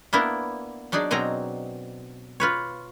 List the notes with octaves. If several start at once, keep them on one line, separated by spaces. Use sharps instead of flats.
A#3 B3 D4 E4 A#4
F#3 D4 D#4 G#4 D5
B2 F#3 C4 G#4 A#5
F4 B4 C#5